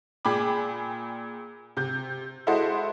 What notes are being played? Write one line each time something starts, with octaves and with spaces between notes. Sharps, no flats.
A#2 G#4 G5 G#5 B5 D6
C3 G6
G#3 E4 F#4 A4 C5 D#5